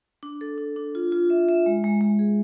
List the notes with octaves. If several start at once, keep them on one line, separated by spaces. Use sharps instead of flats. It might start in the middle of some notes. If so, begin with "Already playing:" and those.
D4
A4
D4
D4
F4
F4
E5
E5
G#3
G#3
G#3
G#4